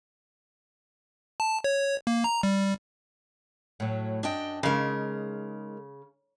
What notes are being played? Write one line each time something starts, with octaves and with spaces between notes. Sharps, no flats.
A5
C#5
A#3
A#5
G3
A2 F#3
F#2 D4 D#5 G5
C#3 G#3 D#4 A#4